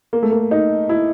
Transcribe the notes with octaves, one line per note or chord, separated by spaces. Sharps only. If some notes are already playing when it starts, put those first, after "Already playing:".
A#3
A3
A#3
D#4
E4